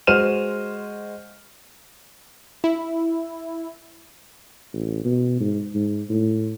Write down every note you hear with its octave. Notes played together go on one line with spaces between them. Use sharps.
G#3 F#4 C5 F6 D#7 E7
E4
A1
B2
G#2
G#2
A2